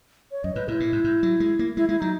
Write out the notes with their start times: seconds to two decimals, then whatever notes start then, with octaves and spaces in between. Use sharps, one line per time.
0.31 C#5
0.44 F#2 D#5
0.55 G#2 B4
0.68 G#2 E4
0.80 A#2
0.92 G#2
1.04 G#2
1.23 F#3
1.40 G#3
1.59 A#3
1.77 G#3 E4
1.89 G#3 E4
2.01 F#3 D#4